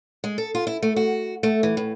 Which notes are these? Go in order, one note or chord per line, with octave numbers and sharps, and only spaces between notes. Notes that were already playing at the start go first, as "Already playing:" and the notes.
G#3
A4
F4
E4
A3
F#4
A3
E3
A2